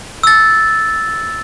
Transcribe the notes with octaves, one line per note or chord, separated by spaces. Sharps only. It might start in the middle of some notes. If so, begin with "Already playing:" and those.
E6 A6